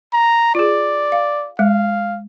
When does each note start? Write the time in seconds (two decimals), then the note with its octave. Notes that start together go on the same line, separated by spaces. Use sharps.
0.13 A#5
0.55 F4 G#4 D5
1.12 F5
1.59 G#3 F5